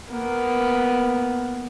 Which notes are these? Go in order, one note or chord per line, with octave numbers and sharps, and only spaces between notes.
A#3 B3